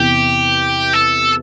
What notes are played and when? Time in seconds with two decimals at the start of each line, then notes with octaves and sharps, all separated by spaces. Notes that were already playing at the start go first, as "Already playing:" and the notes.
Already playing: E2 C3 E3 G4
0.93 A4